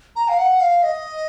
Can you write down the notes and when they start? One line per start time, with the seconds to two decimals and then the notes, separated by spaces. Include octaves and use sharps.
0.16 A#5
0.28 F5
0.38 F#5
0.60 F5
0.83 D#5